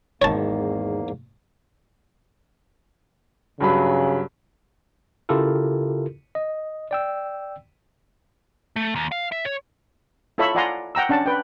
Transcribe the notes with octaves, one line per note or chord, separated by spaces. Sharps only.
G#1 E2 G#2 D#3 A#3 C#5 A5
G2 C#3 F#3 B5
C#3 E4 F4 G4 A4 A#4
D#5
D5 G5 E6
A3
D#2
F5
E5
C#5
E4 F4 A4 C#5 E5 B5
F4 D5 F#5 G#5 A#5 C6
F#5 G5 A#5 E6
C#4 D4 F#5 A5
B4 G5